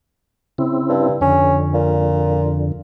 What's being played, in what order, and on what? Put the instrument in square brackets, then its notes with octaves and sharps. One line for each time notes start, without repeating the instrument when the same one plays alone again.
[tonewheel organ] C#3 C4 E4
[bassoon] G2
[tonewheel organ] F2 D3 [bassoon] C#4
[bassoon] A#2